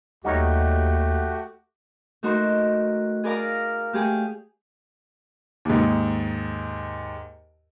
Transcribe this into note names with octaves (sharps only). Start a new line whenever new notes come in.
D#2 G3 A3 D#4 F#4 G4 C#5 F#5
A3 D#4 F#4 A#4 C5
G#4 A#4 D5 F5 A#5
A3 G4 G#4
D#2 G#2